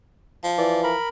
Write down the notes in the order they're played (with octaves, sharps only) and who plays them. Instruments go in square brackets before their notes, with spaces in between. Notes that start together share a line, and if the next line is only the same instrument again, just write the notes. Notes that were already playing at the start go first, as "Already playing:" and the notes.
[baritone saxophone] F3
[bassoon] E3 [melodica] D5
[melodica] A#4 B5